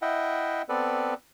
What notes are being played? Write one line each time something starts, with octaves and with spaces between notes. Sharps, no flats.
E4 D#5 E5 F#5 G5
B3 C4 A4 B4 D5